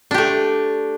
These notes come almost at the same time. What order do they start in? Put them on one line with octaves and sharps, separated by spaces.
D4 G4 A3